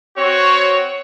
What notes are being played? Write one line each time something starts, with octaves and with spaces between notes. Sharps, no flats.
C4 F#4 C#5